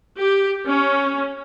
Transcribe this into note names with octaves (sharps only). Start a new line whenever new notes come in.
G4
C#4